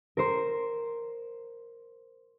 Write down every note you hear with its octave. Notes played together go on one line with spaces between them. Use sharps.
A#4 C5